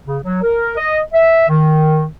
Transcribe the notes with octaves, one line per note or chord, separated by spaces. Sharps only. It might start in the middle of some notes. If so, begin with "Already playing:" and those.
C#3
F#3
A#4
D#5
E5
D#3